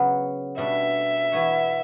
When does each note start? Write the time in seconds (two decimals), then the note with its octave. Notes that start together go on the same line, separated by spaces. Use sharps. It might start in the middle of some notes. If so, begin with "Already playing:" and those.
Already playing: C#3 F#3 B3
0.58 B2 G3 D4 E5
1.32 E3 B3 F#4 C#5